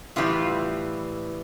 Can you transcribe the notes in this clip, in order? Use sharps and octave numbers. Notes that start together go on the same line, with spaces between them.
A2 E3 G3 F4